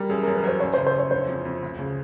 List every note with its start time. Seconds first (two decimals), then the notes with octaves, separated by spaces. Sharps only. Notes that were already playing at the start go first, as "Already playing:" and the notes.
Already playing: G3 A#4
0.10 F#2 G#4
0.23 A#4
0.27 F#2
0.35 B4
0.44 F#3 C5
0.60 F#2 C#5
0.74 C5
0.77 C#3
0.87 C5
0.95 F#2 C#5
1.11 D3 C5
1.28 F2
1.45 F2
1.62 D2
1.79 C#3